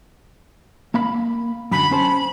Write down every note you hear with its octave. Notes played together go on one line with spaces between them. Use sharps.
A#3 F5 B5
F#2 D3 B5
C#4 C5 A5